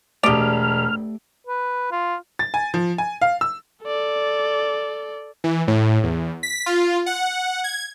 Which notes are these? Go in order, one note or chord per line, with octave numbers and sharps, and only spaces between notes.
E1 A3 G4 D5 D#5 A5 F6
B4
F4
A6
G#5
F3
G#5
F5
E6
A4 D5
E3
A2
E2
B6
F4
F#5
G#6